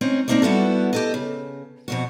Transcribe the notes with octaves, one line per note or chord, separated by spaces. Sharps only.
C4 C#4 D#4
A#3 C4 C#4 D#4 A4 D5
G3 B3 E4 F#4 A4
G4 A4 D#5
C#3
F2 B2 F#4